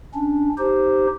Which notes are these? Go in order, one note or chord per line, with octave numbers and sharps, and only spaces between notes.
C#4 D4
D#4 G4 C5